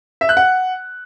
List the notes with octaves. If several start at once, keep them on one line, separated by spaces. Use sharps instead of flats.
E5
F#6
F#5